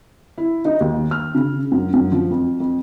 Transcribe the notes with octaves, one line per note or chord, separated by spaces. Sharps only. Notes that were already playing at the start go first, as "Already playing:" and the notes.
E4
D#4
D#2
F6
C#3
F#2
F#2
F3
F2
F2